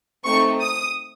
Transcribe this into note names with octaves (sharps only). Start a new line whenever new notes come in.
A3 C4 D#4 C#6
D#6